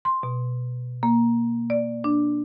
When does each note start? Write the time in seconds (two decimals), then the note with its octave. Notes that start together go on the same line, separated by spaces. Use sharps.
0.05 C6
0.23 B2
1.03 A#3
1.70 D5
2.04 D4